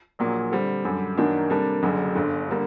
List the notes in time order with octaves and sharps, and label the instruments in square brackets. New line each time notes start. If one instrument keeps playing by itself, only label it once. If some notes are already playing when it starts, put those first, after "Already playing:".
[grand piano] A#1 A#2 F#3 A#3
D3 G3 C4
F#2 D3 G3
F#2 D#3 F#3 A#3 D4
C3 G3 A#3 D4 A4
F#1 F#2 D3
G1 G2 D3
D3 G3 A#3